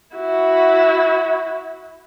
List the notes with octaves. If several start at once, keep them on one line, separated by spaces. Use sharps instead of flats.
E4 F#4